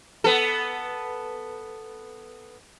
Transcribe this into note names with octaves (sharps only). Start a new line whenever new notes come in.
B3 A4